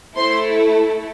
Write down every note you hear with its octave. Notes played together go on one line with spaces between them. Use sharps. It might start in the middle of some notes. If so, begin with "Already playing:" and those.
A3 E4 A4 C5 C6